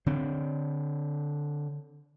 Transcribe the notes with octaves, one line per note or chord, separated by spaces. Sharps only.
D3 C4